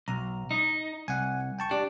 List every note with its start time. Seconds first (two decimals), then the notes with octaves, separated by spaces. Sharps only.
0.08 B1 A#5
0.51 D#4
1.08 C2 F#5 G#5
1.59 G5 A5 C#6
1.71 D4 G4